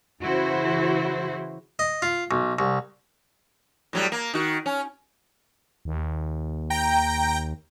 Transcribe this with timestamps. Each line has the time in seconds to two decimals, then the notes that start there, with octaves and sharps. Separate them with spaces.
0.23 C#3 E3 E4 F#4 C5
1.79 D#5
2.02 F4
2.31 B1
2.59 C2
3.93 A2 F#3 G3
4.12 A#3
4.34 D#3 F#4
4.66 C#4
5.85 D#2
6.70 G5 A#5